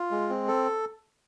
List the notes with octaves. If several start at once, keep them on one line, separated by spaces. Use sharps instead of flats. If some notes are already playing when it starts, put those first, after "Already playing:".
Already playing: F4
G#3
C4
A4